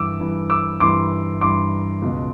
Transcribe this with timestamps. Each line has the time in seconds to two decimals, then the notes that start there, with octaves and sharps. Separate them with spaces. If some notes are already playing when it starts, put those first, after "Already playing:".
Already playing: G2 E3 D6 E6
0.20 G2 E3
0.50 D6 E6
0.80 G2 E3 C6 D6
1.41 G2 E3 C6 D6
2.02 C#2 B2